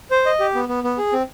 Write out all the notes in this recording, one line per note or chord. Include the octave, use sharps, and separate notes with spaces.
C5
D#5
G4
B3
B3
B3
G#4
C4